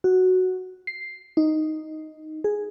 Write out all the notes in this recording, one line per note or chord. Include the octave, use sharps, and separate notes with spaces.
F#4
C7
D#4
G#4